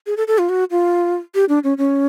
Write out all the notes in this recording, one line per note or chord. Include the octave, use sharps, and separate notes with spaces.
G#4
A4
A4
F4
F#4
F4
G4
D4
C#4
C#4